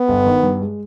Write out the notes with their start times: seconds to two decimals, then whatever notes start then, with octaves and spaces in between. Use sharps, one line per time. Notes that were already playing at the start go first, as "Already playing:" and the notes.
Already playing: B3
0.08 G1
0.26 D#3
0.43 G2
0.61 G#3